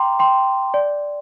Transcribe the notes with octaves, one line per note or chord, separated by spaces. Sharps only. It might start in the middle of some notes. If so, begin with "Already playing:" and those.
Already playing: G5 A#5 C6 D6
G5 C6
D5